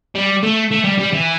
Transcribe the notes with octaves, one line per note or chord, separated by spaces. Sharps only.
G3
A3
A3
G3
G3
E3